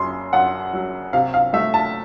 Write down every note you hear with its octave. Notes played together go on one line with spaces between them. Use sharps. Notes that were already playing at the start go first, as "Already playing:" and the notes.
Already playing: F#2 C#3 C6
F#2 F#5
F#3
C3 F5
F5
A3 E5
A5